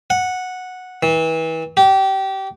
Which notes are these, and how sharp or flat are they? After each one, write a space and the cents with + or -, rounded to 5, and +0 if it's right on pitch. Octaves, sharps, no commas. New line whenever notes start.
F#5 -10
E3 -30
G4 -25